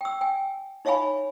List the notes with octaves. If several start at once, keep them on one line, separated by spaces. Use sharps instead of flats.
G5 E6
G5 G#5
D#4 C#5 E5 F5 G#5 B5